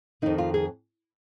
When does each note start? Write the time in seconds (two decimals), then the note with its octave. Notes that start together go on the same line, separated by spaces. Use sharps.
0.22 F2 D#3 D#4
0.38 F4
0.54 G#4